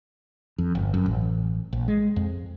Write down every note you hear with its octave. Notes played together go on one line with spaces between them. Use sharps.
F2
G1
F#2
A1
A#1
G#3
F2